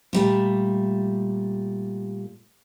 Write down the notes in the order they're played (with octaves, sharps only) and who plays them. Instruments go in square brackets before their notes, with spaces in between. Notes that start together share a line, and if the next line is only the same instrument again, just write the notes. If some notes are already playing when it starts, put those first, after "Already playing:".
[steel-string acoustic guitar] A#2 G3 A3